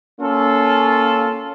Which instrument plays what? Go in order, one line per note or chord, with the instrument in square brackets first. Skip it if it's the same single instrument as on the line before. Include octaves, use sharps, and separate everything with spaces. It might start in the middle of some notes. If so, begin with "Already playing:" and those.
[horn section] A#3 C#4 F4 A4